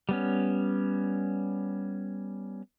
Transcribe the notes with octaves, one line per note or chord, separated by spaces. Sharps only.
G3 B3 C#4